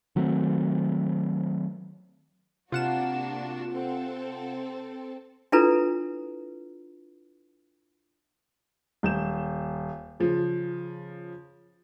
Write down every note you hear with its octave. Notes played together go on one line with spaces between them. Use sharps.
D#3 F#3 A3 C4
C3 A#3 D4 F4 F#4 F#5 E7
C4 A4
D4 E4 F4 A4 B4 A#5
D#1 G6 E7
C#3 F3